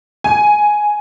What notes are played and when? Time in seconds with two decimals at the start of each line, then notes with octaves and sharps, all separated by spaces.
0.24 G#5